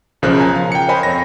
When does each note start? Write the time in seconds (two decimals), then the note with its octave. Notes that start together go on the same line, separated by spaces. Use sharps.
0.22 B1 C#3 F3 A#4 F#6
0.40 G#5 A#5
0.55 F5
0.72 G5 C#7
0.88 A#4 C5 C#5 D#5 G#5 B5
1.03 F2 A#6